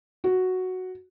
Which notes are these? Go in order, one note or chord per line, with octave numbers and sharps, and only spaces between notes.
F#4